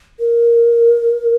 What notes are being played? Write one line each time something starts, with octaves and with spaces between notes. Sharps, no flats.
A#4